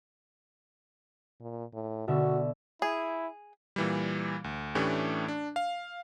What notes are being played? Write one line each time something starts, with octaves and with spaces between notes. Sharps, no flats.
A#2
A2
B2 D3 F#4 E5
E4 G#4
A#2 E3 G3
D2
A2 E3 A3 C#4 D4 G4
D4
F5